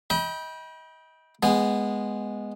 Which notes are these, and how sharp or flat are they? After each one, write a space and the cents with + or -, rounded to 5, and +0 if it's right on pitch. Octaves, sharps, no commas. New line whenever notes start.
D#5 +35 G5 +0 B5 -30
G#3 +0 B3 +0 G#5 -40